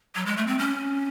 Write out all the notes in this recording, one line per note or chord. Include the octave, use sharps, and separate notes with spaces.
F#3
G#3
A3
C4
C#4